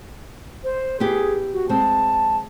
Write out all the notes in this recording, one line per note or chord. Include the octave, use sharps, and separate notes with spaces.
C5
B3 E4 G4 G#4
F#4
G#3 C4 A5